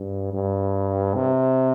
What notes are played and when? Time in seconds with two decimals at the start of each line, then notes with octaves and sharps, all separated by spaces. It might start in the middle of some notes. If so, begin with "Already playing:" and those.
Already playing: G2
0.33 G2
1.14 C3